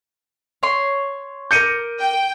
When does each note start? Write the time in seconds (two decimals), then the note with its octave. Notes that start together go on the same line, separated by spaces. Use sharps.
0.63 C#5 C6
1.51 A#4 D6 G6 C#7 D#7
2.00 G5